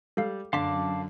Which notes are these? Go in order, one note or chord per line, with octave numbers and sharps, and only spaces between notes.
G3 A4 F5
F#2 D3 F5 A5 C6 D6 B6